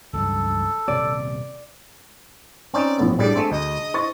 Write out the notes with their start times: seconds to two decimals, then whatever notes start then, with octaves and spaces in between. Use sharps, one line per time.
0.13 C#2 G2 F#3 A4
0.88 D#1 C3 C4 D5
2.74 C4 C#4 D#4 D5
2.98 A#1 A2 B3
3.19 A2 G3 D4 G#4 D5
3.36 G#3 A3 C4
3.52 D2 D#5
3.94 C5 C#6 A6